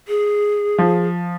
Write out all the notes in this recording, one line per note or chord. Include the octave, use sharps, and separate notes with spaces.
G#4
F3